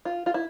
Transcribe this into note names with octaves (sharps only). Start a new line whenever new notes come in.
F4
F4
E4